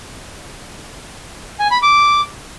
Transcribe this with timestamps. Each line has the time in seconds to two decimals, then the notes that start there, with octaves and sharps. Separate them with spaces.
1.60 G#5
1.71 B5
1.83 D6